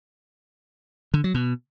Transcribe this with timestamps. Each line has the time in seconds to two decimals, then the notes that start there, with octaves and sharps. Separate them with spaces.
1.14 D3
1.24 F#3
1.34 B2